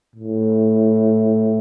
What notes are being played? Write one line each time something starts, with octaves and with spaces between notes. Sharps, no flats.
A2